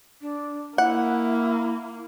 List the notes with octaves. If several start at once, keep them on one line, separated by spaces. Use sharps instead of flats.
D4
A#3 E4 F#5